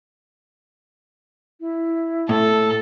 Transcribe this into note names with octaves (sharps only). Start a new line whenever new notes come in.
E4
A2 A4